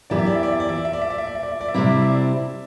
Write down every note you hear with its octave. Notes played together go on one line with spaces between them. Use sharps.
F#2 E3 B3 E4 G4 D5
E5
D5
E5
D5
E5
D5
E5
D5
E5
D5
E5
D5
E5
D5
E5
D5
E5
D5
E5
C3 G3 C4 E4 D5
E5
D5
E5
D5